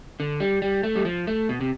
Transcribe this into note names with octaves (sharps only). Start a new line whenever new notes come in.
D3
G3
G3
A3
G3
F3
A3
B2
C3